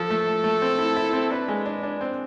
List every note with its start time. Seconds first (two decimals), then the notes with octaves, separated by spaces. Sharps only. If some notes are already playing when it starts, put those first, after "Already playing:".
Already playing: F3 A4
0.10 A3
0.27 A3
0.44 A3
0.62 C4
0.79 E4
0.96 E4
1.13 C4
1.31 D4 B4
1.48 G#3
1.66 D4
1.83 D4
2.01 C4